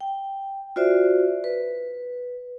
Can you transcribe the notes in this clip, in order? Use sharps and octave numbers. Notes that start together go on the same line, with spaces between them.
G5
F4 F#4 C5 D5 E5
B4